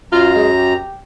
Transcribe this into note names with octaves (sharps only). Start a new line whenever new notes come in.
F#2 F4 A#5
G#3
G4